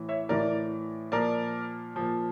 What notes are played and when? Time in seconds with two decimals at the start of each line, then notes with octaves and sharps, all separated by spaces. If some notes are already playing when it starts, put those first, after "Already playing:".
Already playing: A2 E3
0.09 C#5 E5
0.29 A2 E3 A#4 D5
1.12 A#2 F3 A#4 D5
1.96 A#2 F3